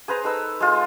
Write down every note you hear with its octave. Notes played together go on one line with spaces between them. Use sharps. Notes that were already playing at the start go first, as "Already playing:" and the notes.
G#4 B4 C5 A#5
D#4 A4 B4 E6
G#3 F4